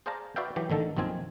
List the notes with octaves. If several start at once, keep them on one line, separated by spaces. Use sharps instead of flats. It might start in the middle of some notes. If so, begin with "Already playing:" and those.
G#4 C5 D5 F5 A5 A#5
F#4 B4 D5 E5 F5 G5
E3 F#3 G4
A1 D3 D#3 A4
A#1 F#2 D#3 C4 F4 G#5